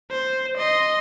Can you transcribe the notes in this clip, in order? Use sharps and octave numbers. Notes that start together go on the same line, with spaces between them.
C5
D#5 C6